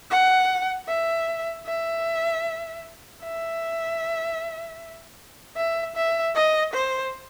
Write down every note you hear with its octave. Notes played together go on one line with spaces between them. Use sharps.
F#5
E5
E5
E5
E5
E5
D#5
C5